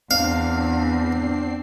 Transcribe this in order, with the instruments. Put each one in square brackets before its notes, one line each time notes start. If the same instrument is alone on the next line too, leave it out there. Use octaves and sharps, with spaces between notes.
[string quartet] E2 [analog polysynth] C4 D4 C7 [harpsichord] F5